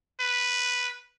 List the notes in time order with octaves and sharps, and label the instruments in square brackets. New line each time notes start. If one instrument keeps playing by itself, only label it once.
[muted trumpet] B4